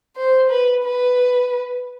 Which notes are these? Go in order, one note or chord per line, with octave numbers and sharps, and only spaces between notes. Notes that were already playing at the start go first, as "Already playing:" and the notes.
C5
B4
B4